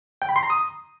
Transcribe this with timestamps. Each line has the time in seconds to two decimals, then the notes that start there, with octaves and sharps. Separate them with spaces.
0.22 G5
0.29 B5
0.36 C6
0.43 A#5
0.50 D#6